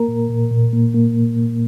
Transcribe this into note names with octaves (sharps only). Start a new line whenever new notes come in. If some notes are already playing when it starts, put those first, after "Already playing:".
Already playing: A#3 A#4
A#2
A#2
A#2
A#3
A#3